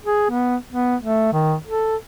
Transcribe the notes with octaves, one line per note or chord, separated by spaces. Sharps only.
G#4
B3
B3
A3
D#3
A4